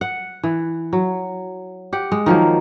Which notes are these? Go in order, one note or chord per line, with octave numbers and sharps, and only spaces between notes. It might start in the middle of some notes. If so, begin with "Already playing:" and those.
F#5
E3
F#3
G4 F#5
G#3
D#3 F3 F#3 A#3